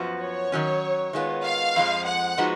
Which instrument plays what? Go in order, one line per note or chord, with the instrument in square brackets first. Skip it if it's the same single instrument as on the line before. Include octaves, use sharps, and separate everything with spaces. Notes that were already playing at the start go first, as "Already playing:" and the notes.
Already playing: [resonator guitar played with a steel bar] F#2 F3 B3 F#4
[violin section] C#5
[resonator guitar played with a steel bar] D#3 F#3 C#4
D#3 G#3 B3 F4
[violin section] F5
[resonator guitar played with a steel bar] F2 F3 G#3
[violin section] F#5
[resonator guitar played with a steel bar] F3 G#3 B3 D#4 F#4